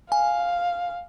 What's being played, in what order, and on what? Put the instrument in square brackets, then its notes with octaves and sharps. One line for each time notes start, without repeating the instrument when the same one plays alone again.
[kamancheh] F5 [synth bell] G#5